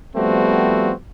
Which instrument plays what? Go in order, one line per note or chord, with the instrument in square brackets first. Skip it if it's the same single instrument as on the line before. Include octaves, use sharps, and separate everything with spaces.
[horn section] F3 G3 A3 B3 C4 F#4